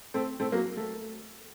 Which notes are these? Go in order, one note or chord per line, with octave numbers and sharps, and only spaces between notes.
A3 C4
A3 C4
F#3 A#3
A3